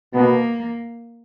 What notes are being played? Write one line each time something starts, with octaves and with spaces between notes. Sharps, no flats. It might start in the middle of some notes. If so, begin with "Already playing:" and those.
B2 A#3 B3